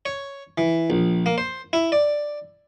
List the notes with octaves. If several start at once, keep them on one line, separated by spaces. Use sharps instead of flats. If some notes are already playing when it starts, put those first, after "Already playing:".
C#5
E3
A#1
A#3
C5
E4
D5